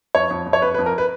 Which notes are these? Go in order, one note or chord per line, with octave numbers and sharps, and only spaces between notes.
F2 C#5
F2
F2
C#5
F2 B4
B4
F2
A#4
B4